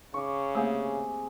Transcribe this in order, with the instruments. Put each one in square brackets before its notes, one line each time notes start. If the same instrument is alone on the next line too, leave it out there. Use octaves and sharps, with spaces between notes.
[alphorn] C#3 [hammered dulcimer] C#6 D6
[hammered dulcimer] C3 G#4 [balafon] A3 A#3